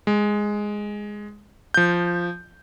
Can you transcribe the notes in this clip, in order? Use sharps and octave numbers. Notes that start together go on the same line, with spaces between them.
G#3
F3 G6